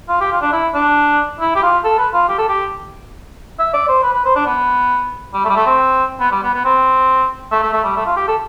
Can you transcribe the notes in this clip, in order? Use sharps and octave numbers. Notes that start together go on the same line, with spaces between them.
F4
G4
F4
D4
E4
D4
E4
G4
F4
A4
B4
F4
G4
A4
G4
E5
D5
C5
B4
B4
C5
D4
B3
G3
A3
G3
A3
C4
B3
G3
B3
B3
C4
A3
A3
A3
G3
A3
F4
G4
A4